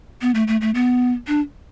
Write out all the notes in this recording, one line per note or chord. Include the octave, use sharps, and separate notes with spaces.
B3
A3
A3
A3
B3
D4